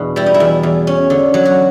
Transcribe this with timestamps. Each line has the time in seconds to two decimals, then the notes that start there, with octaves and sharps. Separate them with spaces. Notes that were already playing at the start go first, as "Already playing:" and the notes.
Already playing: E2 B2 D4
0.16 G3 E4
0.26 D#4
0.34 E4
0.40 E2
0.63 E2
0.87 C#4
1.10 D3
1.34 F#3
1.45 F#4